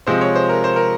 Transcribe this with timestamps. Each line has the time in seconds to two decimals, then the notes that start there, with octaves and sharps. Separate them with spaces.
0.07 C3 F3 G#3 C5
0.21 C#5
0.36 C5
0.49 A#4
0.64 C5
0.76 A#4